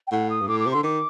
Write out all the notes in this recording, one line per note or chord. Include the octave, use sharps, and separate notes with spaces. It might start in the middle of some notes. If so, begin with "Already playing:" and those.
G5
A2 F#5
D#6
G2
A2 D6
D6
C3
D3 C6
D#3 D6